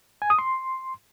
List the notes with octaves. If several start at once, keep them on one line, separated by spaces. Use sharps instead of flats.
G#5
D#6
C6